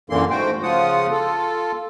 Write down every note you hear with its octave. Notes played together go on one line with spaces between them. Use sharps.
F#2 A#2 D3 E3 A#3 C6
G#2 A3 F#4 C5 G5
C#3 F3 F4 F#5 D#6
F4 A4